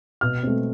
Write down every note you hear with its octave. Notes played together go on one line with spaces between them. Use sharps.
B2 F6
A3 C4